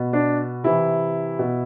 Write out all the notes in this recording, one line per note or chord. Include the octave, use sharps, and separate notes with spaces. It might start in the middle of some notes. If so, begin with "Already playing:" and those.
Already playing: B2
D4
C3 E3 E4
B2